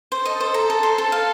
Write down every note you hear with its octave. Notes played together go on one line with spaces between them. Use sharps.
A4 C5
D#5
C5
A#5
A4
C5
A4
F5